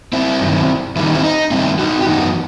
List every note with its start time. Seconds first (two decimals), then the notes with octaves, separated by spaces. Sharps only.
0.13 C4 E4
0.41 G2 D#3 F#3
0.96 E2 D#3 G3 E4
1.06 D#4
1.14 C4 E4
1.24 D#4
1.51 E2 D#3 G3 C4 E4
1.79 D#4 F#4
2.00 G4
2.07 F#2 E3 B3 D#4 F#4